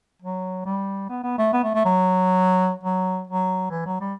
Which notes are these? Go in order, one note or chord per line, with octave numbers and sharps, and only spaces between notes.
F#3
G3
B3
B3
A3
B3
A3
A3
F#3
F#3
F#3
E3
F#3
G3